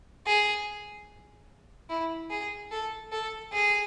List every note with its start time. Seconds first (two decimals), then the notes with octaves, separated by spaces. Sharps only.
0.26 G#4
1.89 E4
2.30 G#4
2.71 A4
3.12 A4
3.53 G#4